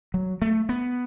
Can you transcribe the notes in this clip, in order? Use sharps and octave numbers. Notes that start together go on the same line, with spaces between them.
F#3
A3
B3